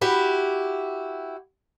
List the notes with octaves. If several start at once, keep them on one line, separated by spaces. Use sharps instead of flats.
E4 F#4 G4